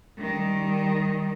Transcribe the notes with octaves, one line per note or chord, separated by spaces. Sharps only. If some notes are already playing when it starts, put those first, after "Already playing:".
D#3 G3